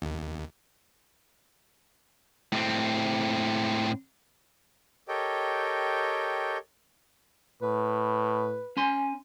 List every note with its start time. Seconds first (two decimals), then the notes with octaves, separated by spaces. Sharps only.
0.02 D#2
2.52 A2 C4
5.08 G4 A4 A#4 C#5 D#5 G5
7.62 A2 B4
8.77 C#4 G#5 C6